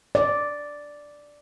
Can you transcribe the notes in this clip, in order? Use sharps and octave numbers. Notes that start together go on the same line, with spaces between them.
D5